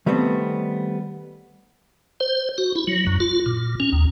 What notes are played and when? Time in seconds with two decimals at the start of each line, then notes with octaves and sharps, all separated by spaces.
0.06 D#3 G3 A3 B3 C4
2.20 C5
2.58 F#4
2.75 E4
2.87 F#3
3.07 F#2
3.20 F4
3.46 A#2
3.80 C#4
3.92 D#2